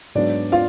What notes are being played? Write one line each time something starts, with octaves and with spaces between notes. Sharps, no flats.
G#2 F#3 B3 D4 D5
F4 F5